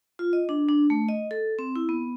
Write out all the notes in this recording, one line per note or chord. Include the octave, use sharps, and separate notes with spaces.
F4
D#5
D4
D4
A3
D#5
A4
C4
E4
B3